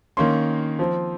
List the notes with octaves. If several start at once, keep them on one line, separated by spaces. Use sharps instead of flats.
D#3 A#3 C#4 C6
F3 C4